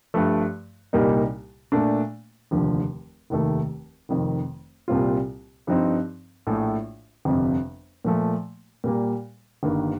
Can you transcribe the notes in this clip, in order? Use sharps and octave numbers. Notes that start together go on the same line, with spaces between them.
G2 F3 A3
C2 A#2 G3 A#3 D#4
A#2 A3 D4
F1 D#2 D3 F3
F1 D#2 D#3 A3
F1 F2 D#3
C2 A#2 G3 C4 F4
G2 F3 C4 D#4
A#1 A2 A3
G1 F2 C3
A#2 F3 A3
A#2 G3 A#3
G1 G2 D#3 A#3